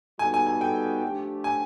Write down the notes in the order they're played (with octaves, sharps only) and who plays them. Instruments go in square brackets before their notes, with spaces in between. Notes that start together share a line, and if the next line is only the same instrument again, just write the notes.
[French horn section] G3 B3 D#4 F#4 A4 [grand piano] G#5
[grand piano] G#5
G#5
G5
[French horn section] F3 A3 D4 G4
[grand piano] G#5